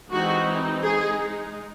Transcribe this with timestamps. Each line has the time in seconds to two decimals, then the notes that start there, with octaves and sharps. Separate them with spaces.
0.10 E3 G#3 C4 D#4 F#4
0.83 G#3 D#4 G#4